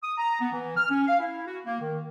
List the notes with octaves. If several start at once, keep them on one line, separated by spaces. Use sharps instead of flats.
D#6
A#5
B3
E3
F6
C#4
F5
E4
F#4
A#3
D#3